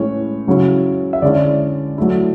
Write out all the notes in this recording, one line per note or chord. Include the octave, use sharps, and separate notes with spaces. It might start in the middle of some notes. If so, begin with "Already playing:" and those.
Already playing: A2 E3 G#3 C#4 C#5
C#3 F#3 C#4 E4
E5
D3 G#3 C#4 E4 D5
F#3 A3 E4